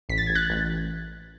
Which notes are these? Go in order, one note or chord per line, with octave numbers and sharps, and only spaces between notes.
A1 B6
A6
A1 G#6
F#6 A6
A1